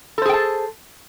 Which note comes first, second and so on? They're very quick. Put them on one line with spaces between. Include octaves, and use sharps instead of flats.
A4 C5 G#4 G5 A5